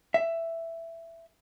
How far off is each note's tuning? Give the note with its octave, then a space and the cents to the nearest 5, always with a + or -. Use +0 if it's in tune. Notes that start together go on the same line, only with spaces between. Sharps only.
E5 +10